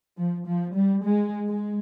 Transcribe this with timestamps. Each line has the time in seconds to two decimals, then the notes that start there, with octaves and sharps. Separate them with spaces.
0.17 F3
0.46 F3
0.74 G3
1.03 G#3
1.47 G#3